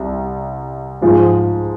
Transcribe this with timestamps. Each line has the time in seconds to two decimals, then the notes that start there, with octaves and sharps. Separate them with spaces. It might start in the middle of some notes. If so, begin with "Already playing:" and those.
Already playing: C2
1.02 G#2 F3 G#3